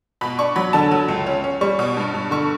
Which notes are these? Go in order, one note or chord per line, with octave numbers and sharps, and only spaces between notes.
B2 B5
D4 C#6
F#3 B5
D3 A5
F#3
C#2
C#4
C#4
G3 C#6
B2
G2
G2
D3 C#6